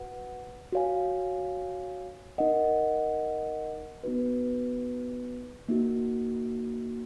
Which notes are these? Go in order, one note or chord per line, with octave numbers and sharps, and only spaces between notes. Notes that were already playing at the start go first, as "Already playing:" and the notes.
Already playing: F#4 B4 F#5
F#4 C#5 F5 G#5
D#4 A#4 D#5 F#5
B3 D#4 F#4 B4
A#3 D#4 F#4